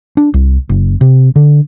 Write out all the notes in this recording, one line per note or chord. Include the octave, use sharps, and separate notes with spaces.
D4
C2
F#1
C3
D3